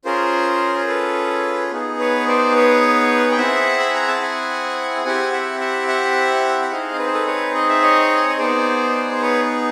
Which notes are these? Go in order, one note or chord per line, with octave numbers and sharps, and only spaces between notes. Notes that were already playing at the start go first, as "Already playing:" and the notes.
C#4 F4 G#4 A#4 C5
C5
A4 B4
B3 D#4 G#4
B4 C#5
C5 D5
B4 C#5
G5
C4 E4 G#4 E5 F#5
B5
A#5
A5
F#5 G#5
C4 E4 G4 F#5 G#5
E5 F#5
E5 F#5
E5 F#5
F#5
C4 D#4 G#4 D#5 F5
B4
C5
A4 B4
B4 C#5
D#5
E5
C#5 D#5
D#5
B3 D#4 G#4 C5 D5
C5
B4 C#5